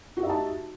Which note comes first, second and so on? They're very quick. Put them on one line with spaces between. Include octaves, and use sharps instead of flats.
F#4 G4 E5 D#4 A5